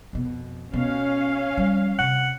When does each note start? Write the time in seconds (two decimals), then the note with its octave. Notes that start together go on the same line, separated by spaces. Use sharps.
0.13 F2 B2
0.74 B2 C#4 F5
1.57 F3 G3
1.99 C3 F#5